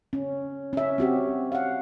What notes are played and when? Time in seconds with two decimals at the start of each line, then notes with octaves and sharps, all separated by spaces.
0.13 C#4
0.73 C#4 E5
0.98 C4 F#4 G4
1.52 F5 F#5